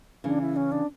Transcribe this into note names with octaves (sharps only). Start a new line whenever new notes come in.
C#3 E3 D4
E4
C#4
D4